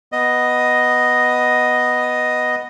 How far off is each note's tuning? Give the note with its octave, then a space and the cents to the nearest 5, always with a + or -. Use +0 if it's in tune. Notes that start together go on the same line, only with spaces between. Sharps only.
B3 +0 D#5 +0